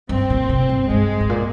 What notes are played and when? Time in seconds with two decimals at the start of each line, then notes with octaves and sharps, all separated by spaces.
0.09 G2 C4
0.30 A#2
0.49 C3
0.69 G2
0.90 G2 G#3
1.20 G#2
1.29 A#2